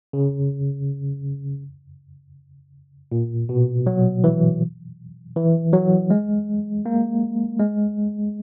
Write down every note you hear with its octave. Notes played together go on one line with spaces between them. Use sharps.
C#3
A#2
B2
F#3
E3
E3
F#3
G#3
A#3
G#3